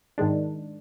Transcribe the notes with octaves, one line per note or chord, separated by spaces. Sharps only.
G#2 D#3 G#3 D4